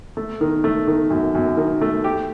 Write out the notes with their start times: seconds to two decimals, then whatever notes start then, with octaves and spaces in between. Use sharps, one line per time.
0.17 A3
0.41 D#3
0.64 A3
0.87 D#3
1.10 F#2
1.35 F#2
1.57 D#3
1.81 A3
2.04 G4